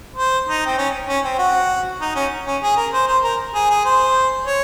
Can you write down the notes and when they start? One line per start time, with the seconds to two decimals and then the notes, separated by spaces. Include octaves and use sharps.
0.16 C5
0.47 D#4
0.66 C4
0.78 C#4
1.08 C#4
1.24 C4
1.38 F#4
2.01 D#4
2.15 C#4
2.46 C#4
2.63 G#4
2.77 A#4
2.93 C5
3.08 C5
3.24 A#4
3.54 G#4
3.70 G#4
3.85 C5
4.46 C#5